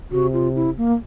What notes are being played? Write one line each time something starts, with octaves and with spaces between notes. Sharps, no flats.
C3 F#4
F4
E4
A#3